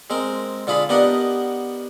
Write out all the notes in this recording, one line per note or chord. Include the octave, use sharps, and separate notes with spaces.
G#3 C4 A#4
D3 F4 G#4 B5
B3 D4 G4 A#4 D#5 F#5